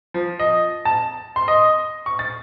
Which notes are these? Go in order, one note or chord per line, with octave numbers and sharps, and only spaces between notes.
F3
D#5
A5
C6
D#5
C#6
A6